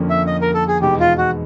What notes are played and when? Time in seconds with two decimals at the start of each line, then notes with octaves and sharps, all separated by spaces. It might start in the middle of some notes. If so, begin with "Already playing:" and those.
Already playing: F2 D3 F3 A#3 C#4
0.10 E5
0.27 D#5
0.42 A#4
0.54 A4
0.68 G#4
0.82 E2 B2 G#3 B3 D#4 G4
1.00 F4
1.18 F#4